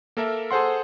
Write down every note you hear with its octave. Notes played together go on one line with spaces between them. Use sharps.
A#3 A4 A#4 E5
G#4 A4 C5 F#5 C6